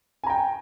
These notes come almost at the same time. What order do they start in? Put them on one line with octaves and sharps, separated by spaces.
G#5 A#5 G5